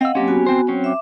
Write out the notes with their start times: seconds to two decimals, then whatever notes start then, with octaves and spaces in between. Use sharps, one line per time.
0.01 C4 D#5 F5 F#5 E6
0.15 F#3 A#3 C4 C#4 G4
0.28 B3 F#4 G#5
0.46 C4 C5
0.68 F#3 C4 C#4
0.84 E5 D6